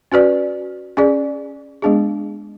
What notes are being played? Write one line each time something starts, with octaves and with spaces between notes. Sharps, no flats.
C#4 F#4 B4 D5
C#4 G#4 D5
G#3 B3 D4 G#4